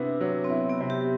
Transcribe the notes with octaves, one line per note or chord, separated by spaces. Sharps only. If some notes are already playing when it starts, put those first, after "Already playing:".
Already playing: C3 B3 C4 D4 E4
F#3
C4
B3 E4
B3
C3
G4